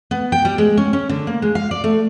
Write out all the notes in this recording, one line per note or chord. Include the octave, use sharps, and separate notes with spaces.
B3
G5
G3
G#3
C#4
C#4
D3
A#3
G#3
F5
D5
A3